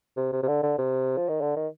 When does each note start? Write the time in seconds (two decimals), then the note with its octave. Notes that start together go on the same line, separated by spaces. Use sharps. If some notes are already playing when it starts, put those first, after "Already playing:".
0.17 C3
0.33 C3
0.43 C3
0.48 D3
0.63 D3
0.78 C3
1.17 F3
1.29 D#3
1.41 D3
1.56 D#3